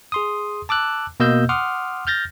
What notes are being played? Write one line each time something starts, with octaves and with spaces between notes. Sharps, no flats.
G#4 C6 D#6
A5 D6 E6 F#6
B2 A#3 D#5 E6 G6
F#5 C6 D6 D#6 F6
F6 G6 A6 A#6